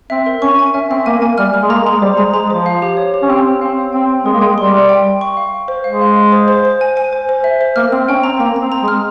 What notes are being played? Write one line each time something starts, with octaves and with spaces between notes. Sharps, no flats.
C4 E5
A#4
C#4 C#6
G#5
C#4 E5
C4 E5
A#3 G#5
A#3 G#5
G3 F6
F6
G#3
A#3 A#5
G#3 A#5
G3 C5
G#3 A#5
G#3 A#5
F3 C5
F5
G4
C#5
G4
C#4
C4 G4
G4
C4 F5
C#5
C4 G5
G5
G#3 A#4
A#3
G#3 G5
G3 C6
E5
G5
G5
C#6
F5
C#6
C5
G#3 F5
F5
F5
C5
C5
C5
G#5
G#5
C5
C5
E5
C5
A#3 F6
C4 F6
C#4 G5
C4 A#5
A#3 A#5
A#5
C4
A#5
G#3
F6